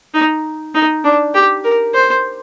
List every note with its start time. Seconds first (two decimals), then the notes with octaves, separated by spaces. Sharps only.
0.14 D#4
0.74 D#4
1.04 D4
1.34 G4
1.64 A#4
1.94 C5